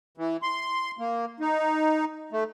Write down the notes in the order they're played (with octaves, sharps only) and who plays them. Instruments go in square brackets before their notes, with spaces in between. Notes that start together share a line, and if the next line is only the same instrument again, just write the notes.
[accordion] E3
C6
A#3
D#4
A3